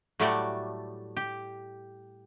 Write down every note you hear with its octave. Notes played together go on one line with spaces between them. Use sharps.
A2 F#3 G3 A3 F#4 D5
G4